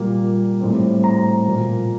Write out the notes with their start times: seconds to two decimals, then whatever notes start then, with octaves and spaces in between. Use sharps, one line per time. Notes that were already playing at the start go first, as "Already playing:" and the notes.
Already playing: A#2 G3 A#3
0.60 A2 G3 C4
1.04 A#5
1.45 A#2 F3 A#3